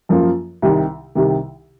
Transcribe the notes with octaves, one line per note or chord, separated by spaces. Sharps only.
F#2 F3 A#3 F4
C2 C3 D#3
C2 C3 D#3